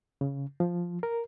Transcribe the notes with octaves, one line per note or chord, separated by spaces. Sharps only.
C#3
F3
A#4